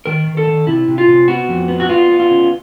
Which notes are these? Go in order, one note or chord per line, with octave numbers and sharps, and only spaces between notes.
D#3 A#4
D#3
A4
D#3
C3 E4
C3
F4
C3
B3 F#4
F2
B3
F#4
B3 F4
B3
F4
C#3